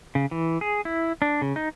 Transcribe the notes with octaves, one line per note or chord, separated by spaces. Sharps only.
C#3
E3
G#4
E4
D4
C#3
D#4